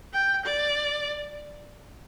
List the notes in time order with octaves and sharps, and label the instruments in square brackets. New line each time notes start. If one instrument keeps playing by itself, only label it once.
[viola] G5
D5